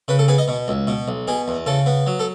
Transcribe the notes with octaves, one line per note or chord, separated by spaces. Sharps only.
C#3 B4
A4
B3 G#4
D#5
B2
C#2
B2
B1
B2 G#4
E2
C#3 A4
B3
F#3
A4